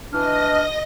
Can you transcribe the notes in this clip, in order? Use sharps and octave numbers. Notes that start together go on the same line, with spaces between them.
E3 D4 D#5 F6 A#6